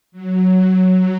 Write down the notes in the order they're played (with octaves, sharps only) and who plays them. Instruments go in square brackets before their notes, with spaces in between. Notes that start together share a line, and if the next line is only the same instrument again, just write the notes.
[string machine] F#3